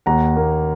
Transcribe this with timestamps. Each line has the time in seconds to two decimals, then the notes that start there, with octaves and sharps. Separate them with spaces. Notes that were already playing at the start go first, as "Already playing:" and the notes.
0.06 D#2 F#5 A#5
0.37 A#3